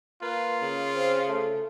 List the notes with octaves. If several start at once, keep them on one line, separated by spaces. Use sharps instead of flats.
A#3 F4 B4
C#3
C4
A3